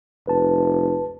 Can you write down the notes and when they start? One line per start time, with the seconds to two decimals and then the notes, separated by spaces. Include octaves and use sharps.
0.27 F1 B4 A5